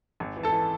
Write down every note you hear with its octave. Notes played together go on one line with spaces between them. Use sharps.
G#1
E3
A4 A5
E3